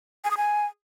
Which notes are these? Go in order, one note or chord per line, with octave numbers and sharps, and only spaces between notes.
G#5
D#6
G#5